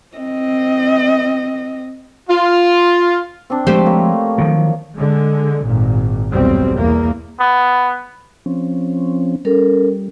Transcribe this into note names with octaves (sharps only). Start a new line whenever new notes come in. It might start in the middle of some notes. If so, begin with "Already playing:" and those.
C4 D#5
F4
C4 D4
F3 G#3 A3 G4 C5
A#3 C#5
D#3 F3 F#3
D3 G#3
G#1 A#2
F1 B1 E2 G2 G3 C4
E2 A#3
B3
F3 C4 C#4
G3 C#4 A4 A#4